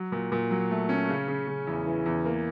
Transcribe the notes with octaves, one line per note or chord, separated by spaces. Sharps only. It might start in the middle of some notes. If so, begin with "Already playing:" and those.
Already playing: F#3
A#2
A#2
F#3
A3
C#4
C#3
C#3
C#3
E2
E3
E2
A#3